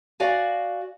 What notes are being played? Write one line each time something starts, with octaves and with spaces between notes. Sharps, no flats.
F#4 D5 F5 G#5